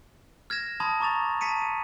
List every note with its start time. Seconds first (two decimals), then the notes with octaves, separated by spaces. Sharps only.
0.50 F6 G#6 A#6 E7
0.80 A5 B5 C6 D#6 G#6
1.01 A#5 C#6 D6 A6 F7
1.41 A5 B6 C#7 D#7
1.62 D#7